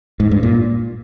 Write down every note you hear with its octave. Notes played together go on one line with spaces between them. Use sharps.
G#2
G2
A#2